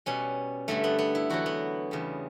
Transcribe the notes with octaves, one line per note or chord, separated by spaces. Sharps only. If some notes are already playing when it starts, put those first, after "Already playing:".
B2 G3 C#4
G2 D3 G3 A3
B3
B3
E4
E2 D3 F#3 F#4
B3
E2 C#3 G3